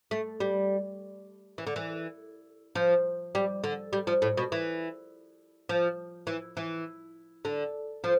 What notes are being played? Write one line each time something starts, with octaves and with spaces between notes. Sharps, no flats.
A3
G3
E3
D3
E3
F3
G3
D3
G3
F3
A2
B2
E3
F3
E3
E3
D3
F3